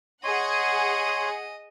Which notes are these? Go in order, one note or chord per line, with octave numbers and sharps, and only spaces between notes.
G#4 C#5 D#5 F#5 C6